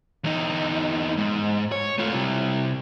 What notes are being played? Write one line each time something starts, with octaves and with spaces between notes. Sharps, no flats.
E2 D#4
G#2
C#5
A3 F4
C3 G3